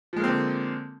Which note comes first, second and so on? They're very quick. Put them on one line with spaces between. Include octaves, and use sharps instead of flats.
F3 G#3 A#3 C4 D3